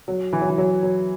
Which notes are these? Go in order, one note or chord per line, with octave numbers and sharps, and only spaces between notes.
F#3
E3
F#3
E3
F#3
F#3